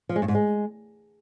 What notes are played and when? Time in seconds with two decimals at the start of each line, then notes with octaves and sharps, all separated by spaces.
0.09 F3
0.16 G#3
0.22 G2
0.28 G#2
0.35 G#3